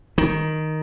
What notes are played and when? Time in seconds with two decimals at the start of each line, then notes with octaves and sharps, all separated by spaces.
0.18 D#3